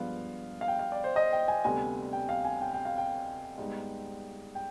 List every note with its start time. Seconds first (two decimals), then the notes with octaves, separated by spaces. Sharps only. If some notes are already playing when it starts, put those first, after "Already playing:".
Already playing: G2 F3 G#3 B3 F5
0.61 F5
0.68 G5
0.79 F5
0.92 D5
1.04 C5
1.16 D#5
1.32 G5
1.48 G#5
1.64 D2 C3 G3 B3 G#5
2.13 G5
2.29 F5
2.45 G#5
2.61 G5
2.74 G5
2.85 F5
2.98 G5
3.58 G#2 G3 B3
4.55 G5